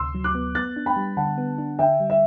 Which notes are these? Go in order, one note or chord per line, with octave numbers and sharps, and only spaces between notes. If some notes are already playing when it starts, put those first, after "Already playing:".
Already playing: D2 C3 C6 E6
F#3
D6 F#6
B3
B3 F#6 A6
D4
G5 B5
G3
D3 F#5 A5
B3
D4
D3 E5 G5
G3
E5